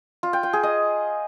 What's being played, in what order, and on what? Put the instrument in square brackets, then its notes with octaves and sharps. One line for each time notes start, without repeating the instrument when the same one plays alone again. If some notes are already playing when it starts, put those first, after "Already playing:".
[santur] F4
G5
G5
G#4
D#5